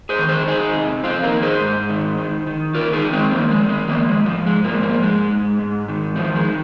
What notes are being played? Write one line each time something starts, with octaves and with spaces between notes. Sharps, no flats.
G#4 C5
D#3
G#4 C5
D#3 D#4 G#4
C3
F2 C4 F4
A#3 D#4
D#3
G#4 C5
G#2
D#3
D#3
D#3
D#3 F4 A#4
D#4 G#4
D#3
G#3 C4
D#3 F3 A#3
G#3
D#3
G#3
D#3 F3 A#3
G#3
G#2
F3
G#2 G#3
F3 A#3
G#2
F3 A#3
G#2 G#3
G#2
G#2
D#3
D#3 F3
G#3
D#3